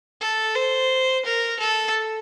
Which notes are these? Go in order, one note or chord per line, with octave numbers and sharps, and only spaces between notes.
A4
C5
A#4
A4